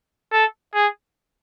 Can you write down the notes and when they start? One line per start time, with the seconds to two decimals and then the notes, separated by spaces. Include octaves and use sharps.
0.33 A4
0.74 G#4